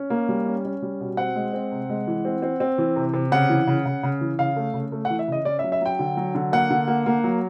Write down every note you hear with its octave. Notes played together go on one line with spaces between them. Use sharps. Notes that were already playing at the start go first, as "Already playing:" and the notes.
Already playing: C#4
A#3
G3
C#4
C#4
G3
B2
C4 F#5
G#3
C4
C3
G#3
E3
C4
C4
C4
E3
C3
C3
C#3 F#5
E3
C#3
C#3
C#3
E3
C#3 F5
A3
C#3
A3
F#5
E3
E5
C#3 D#5
C#4 D5
E5
F#3
E5
F#3 G5
D3
F#3
D3
A#3 F#5
D3
A#3
A#3
F#3